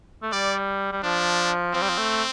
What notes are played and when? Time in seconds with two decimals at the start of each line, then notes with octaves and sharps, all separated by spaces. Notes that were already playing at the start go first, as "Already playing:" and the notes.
0.22 A3
0.32 G3 D5
0.92 G3
1.03 F3 D4
1.74 F3 C4
1.82 G3
1.89 F3
1.98 A3